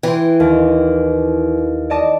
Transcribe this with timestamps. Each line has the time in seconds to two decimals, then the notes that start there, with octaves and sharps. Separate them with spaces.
0.03 E3 G5 C6
0.40 D#2
1.90 D5 D#5 A5